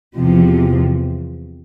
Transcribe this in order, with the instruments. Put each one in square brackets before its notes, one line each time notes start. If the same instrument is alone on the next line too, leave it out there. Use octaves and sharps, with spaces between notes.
[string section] E2 C3 F3